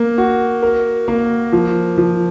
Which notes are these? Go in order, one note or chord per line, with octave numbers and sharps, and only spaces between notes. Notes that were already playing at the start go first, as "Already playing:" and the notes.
Already playing: A#3
F#4
A#4
A#3
F3
F3